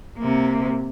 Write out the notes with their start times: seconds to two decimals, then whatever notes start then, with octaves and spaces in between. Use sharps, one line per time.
0.18 C3 A#3